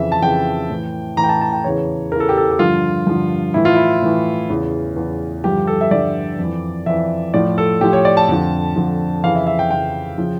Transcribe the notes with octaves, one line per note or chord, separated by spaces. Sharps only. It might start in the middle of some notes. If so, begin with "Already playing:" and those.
Already playing: F2 C#3 E3 E5
A5
F2 C#3 E3 G5
A2 E3
A2 E3 A#5
G5
A5
A5
G5
E2 C#3 E3 C#5
E2 C#3 E3 A#4
A4
G4
A4
G4
G2 D3 F3 F4
G2 D3 F3
A2 E3 E4
F4
E4
A2 E3
E2 C#3 E3
E2 C#3 E3
G2 D3 F3 G4
A4
E5
G2 D3 F3 D5
F2 E3
F2 E3 E5
A2 F3 D5
A4
A2 F3 G4
C#5
D5
A5
F2 D3 F3
F2 D3 F3
F2 C#3 E3 F5
E5
E5
G5
F2 C#3 E3 G5
C#3 F3